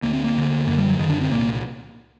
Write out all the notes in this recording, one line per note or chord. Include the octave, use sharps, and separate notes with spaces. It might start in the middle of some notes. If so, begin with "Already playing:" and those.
D2 D3 A#3
C4
A#3
D2 D3
F#2 D3 A#3
G3
F#3
F#2 D3 D#3
D4
C4
C2 A#2 A#3